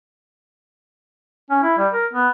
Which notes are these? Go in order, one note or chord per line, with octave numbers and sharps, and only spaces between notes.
C#4
E4
G3
A#4
B3